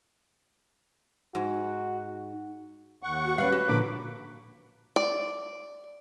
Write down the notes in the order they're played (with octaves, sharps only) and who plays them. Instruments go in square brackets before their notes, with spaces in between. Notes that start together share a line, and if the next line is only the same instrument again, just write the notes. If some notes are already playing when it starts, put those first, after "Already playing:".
[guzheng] G#2 [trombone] F#4
[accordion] D#2 F#5 C#6
[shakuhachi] F#4
[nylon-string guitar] G3 C#4 [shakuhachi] B4 [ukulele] D5 F5
[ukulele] F#4
[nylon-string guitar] A#2 D3 F3 [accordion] B5 D6
[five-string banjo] D5